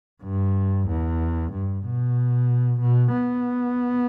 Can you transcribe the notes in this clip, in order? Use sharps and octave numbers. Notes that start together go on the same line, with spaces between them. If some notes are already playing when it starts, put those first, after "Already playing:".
G2
E2
G2
B2
B2
B3